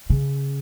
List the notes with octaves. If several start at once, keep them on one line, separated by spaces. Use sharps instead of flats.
C#3